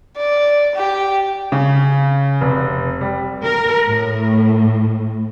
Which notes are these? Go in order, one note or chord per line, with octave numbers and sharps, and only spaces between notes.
D5
G4
C#3
F1
G3
A#4
A2